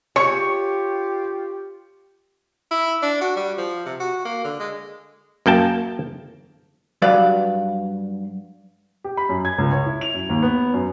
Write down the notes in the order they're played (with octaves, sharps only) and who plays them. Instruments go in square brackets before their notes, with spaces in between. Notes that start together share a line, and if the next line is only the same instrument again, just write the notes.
[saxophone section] F4 G4 [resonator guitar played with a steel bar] C#5 [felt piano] C#6 C#7
[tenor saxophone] E4
D4
F#4
G3
F3
C3
F#4
A#3
D3
G#3
[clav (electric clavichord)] F#2 A#3 G5 A5
[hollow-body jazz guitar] G2 F#3 B4 D5 F5
[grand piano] G4
B5
F#2
G#6
C#2
C#5
E4
F7
F#2
D#2
B3
F#2